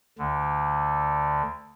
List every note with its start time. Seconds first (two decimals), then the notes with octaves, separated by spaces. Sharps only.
0.18 D2 D3